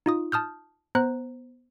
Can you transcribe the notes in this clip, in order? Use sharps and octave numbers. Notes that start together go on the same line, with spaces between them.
D#4 F4 D#6
A5 D#6 F6 G6
B3 C5 A#5 F#6